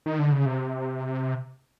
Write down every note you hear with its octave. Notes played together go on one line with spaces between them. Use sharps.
D#3
D3
C#3
C3